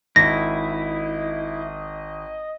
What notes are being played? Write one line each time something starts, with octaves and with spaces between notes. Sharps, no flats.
G#1 E4 D#5 A#6